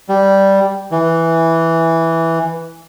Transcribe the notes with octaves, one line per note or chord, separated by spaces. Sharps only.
G3
E3